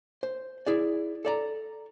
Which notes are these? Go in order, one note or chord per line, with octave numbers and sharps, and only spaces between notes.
C5
E4 G#4 D5
A4 D5 A#5